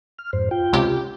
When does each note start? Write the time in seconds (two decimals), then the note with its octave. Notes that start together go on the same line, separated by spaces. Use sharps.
0.18 F6
0.33 F2 G#2 C5
0.51 F4 G5
0.73 C#2 C3 G4